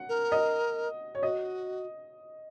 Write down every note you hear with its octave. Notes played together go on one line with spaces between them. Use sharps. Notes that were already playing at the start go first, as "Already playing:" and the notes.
Already playing: F#5
A#4
D#5
C#5
F#4 D#5